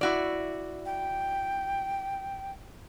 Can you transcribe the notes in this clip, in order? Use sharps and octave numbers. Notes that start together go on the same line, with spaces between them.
E4 F#4 D5
G5